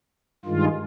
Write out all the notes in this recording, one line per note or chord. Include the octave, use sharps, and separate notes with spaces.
G2 D#3 G#3 F4